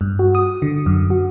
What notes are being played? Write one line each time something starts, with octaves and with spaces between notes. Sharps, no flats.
G2
F#4
D#6
D3
F#2
F#4